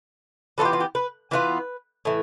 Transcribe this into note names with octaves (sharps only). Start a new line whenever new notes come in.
E3 B3 F4 A4
G4
F4
G4
B4
E3 B3 F4 B4
A2 E3